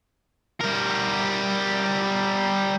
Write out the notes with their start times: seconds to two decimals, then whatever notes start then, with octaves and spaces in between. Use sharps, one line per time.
0.61 G3 A#4